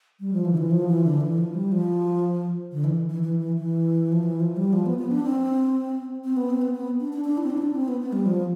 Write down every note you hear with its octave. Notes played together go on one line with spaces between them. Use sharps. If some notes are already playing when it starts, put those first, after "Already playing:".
G3
F3
E3
D3
E3
F3
E3
D3
E3
F3
G3
F3
D3
E3
E3
E3
E3
E3
F3
E3
F3
G3
F3
B3
B3
D4
C4
C4
B3
C4
B3
B3
D4
D4
D4
E4
C4
D4
E4
D4
C4
B3
B3
G3
F3